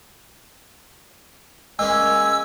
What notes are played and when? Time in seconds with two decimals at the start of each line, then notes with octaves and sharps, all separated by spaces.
1.79 G#3 A#3 C#4 G#5 E6